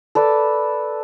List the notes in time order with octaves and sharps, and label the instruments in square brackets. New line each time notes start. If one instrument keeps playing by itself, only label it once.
[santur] A4 B4 D5